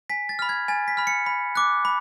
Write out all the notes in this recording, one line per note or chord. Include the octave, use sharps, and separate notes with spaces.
G#5 B6
A6
B5 F6
G#6
G#5 A6
B6
B5 F6
C#7
B5
D6 F#6
B5